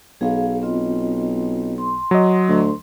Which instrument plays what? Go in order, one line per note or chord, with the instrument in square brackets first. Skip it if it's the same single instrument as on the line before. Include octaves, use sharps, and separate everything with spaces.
[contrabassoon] B1 [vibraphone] G#4 F5
[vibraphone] C4 F4 D#5
C6
[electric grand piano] F#3 D#5
[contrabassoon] D2